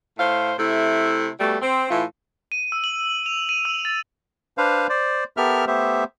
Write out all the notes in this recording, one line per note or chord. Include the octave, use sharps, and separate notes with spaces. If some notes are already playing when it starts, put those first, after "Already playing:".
A2 C5 F5
C3 A3 E4
B2 G3 A3
C4
A2 E3 F4
D#7
E6
F#7
F7
D#7
E6
A6
D4 B4 C5 F5
C5 D5
B3 G4 A4 A#4 E5 F6
A3 B3 G4 C5 E5